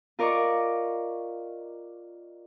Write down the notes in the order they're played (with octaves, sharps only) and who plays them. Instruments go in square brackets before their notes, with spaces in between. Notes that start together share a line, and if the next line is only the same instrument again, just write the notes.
[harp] F4 A#4 D5 D#5 C#6 D6